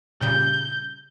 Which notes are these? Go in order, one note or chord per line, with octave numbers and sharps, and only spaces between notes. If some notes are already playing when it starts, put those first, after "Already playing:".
A#2 C#3 G3 G6